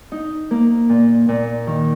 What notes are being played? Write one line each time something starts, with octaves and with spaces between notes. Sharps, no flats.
D#4
A#3
A#2
A#2
D#3